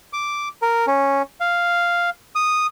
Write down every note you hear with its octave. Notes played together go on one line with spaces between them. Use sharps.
D6
A#4
C#4
F5
D#6